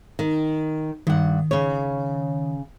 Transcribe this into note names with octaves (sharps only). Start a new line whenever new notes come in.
D#3
G2 D#3 F#5
C#3 C#5